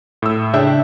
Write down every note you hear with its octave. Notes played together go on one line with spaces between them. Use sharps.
A2 E6
C#3 D4 E5 G5